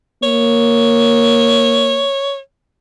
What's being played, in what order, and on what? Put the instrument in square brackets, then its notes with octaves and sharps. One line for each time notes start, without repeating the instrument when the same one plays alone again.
[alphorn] A#3 [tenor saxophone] C#5